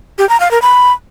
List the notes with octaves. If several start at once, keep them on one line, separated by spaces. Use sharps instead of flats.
G4
A#5
F5
A#4
B5